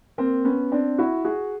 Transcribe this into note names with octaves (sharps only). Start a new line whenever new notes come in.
A#3 C4
B3 C#4
C4 D4
E4 F#4
F#4 G#4